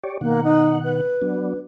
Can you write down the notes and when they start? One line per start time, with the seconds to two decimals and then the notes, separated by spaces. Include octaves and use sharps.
0.04 G4 C#5 D5
0.21 B2 D#3 A#3 F#5
0.43 D#4
0.84 B4
1.22 F#3 B3 D4